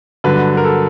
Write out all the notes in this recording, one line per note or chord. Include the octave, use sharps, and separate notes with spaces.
G2 D3 F#3 B4
A#4
A4